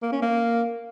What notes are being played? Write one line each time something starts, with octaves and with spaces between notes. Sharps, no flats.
A#3
C#4
A#3